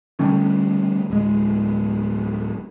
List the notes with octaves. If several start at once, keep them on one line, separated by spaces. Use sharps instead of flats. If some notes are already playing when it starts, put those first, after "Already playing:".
D3 G3 A3 C#4
D1 G#3